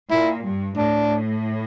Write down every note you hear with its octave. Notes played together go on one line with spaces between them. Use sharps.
A#2 E4
G2
A2 D4